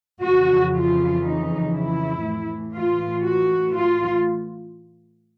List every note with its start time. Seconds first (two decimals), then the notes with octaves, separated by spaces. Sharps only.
0.22 F2 C#3 E3 F#4
0.73 F4
1.23 D#4
1.73 E4
2.23 A2 E3
2.73 F4
3.23 F#4
3.74 F4